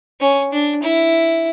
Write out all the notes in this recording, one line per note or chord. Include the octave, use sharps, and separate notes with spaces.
C#4
D4
E4